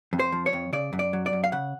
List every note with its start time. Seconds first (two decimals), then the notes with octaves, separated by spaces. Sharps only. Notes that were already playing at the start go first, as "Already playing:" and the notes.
0.13 F2
0.19 C5
0.32 F3
0.46 C#5
0.53 F2
0.73 C#3 D5
0.93 F#2
0.99 D5
1.13 F#3
1.26 D5
1.33 F#2
1.44 F5
1.52 C#3 F#5